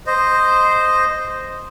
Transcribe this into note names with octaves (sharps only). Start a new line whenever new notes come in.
C5 D#5